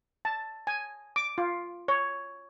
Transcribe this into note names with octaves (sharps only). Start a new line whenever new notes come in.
A5
G#5
D6
F4
C#5